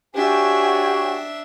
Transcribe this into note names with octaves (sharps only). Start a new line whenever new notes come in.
D4 F#4 G4 C#5 E5 G5 G#5 C#6